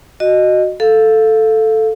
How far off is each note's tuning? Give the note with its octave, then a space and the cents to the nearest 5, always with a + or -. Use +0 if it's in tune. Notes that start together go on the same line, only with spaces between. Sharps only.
F#4 +0 D#5 -15
A4 +0 F5 +0